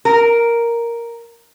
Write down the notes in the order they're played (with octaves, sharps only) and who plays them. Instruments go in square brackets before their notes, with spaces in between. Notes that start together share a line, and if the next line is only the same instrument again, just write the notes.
[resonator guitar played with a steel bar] A#4